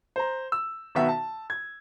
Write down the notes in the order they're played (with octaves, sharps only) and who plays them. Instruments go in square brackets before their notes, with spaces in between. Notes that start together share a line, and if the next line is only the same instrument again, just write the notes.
[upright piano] C5 A#5
E6
B1 D#3 B3 F#4 E5
A5
G#6